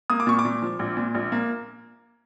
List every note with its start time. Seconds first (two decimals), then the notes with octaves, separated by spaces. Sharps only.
0.10 A#3 D#6
0.20 D6
0.27 A#2 C#6
0.39 D6
0.45 A#2
0.62 F3
0.79 A#1
0.97 A#2
1.15 A#1
1.32 A#3